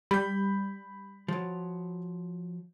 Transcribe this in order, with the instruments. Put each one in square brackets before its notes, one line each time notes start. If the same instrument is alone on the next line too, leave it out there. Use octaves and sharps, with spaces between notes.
[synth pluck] G3 [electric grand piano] B5 G6
[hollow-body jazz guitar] F3 F#3